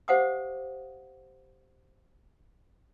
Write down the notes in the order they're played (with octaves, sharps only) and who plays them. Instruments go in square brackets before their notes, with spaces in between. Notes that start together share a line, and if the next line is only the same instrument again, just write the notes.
[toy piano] G4 C5 F5 F#5 D6 D#6